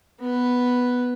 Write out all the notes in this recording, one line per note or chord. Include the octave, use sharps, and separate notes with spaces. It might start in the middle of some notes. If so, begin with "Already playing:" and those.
B3 B4